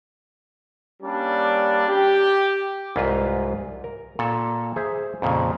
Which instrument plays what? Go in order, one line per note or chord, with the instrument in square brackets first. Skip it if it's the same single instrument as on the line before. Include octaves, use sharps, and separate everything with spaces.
[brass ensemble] G3 A#3 C#4 D4 D5
G4
[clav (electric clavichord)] C2 G#2 F4 B4
A#4
A#2 A4
G#4 C5 E5
F2 A#2 C#3